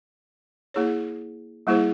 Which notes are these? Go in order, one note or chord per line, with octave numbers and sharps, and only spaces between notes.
A#3 E4 G#4 C#5
G3 A#3 E4 G#4 C5